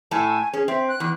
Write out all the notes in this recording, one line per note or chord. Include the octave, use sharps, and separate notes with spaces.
A2 A3 A4 G#5
C#4 G#4
C4 E5
F#6
E2